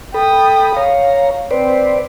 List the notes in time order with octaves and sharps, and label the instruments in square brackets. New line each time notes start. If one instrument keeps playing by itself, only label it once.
[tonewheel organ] A4 B5 [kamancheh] G5 D#6
[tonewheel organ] C#5 A#5 [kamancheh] F5
[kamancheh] C4 [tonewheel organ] B4 C5 D5